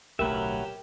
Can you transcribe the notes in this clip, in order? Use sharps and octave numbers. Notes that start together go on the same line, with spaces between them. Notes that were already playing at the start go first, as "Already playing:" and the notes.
D1 B1 F#3 A3 G4 A#4 B4 E5